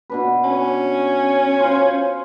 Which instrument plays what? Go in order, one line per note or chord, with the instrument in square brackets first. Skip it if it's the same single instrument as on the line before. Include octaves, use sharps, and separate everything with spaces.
[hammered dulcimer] B2 D4 B4
[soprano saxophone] C#4
[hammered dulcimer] F4 C5